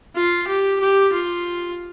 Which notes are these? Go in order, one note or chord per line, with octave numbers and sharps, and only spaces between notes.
F4
G4
G4
F4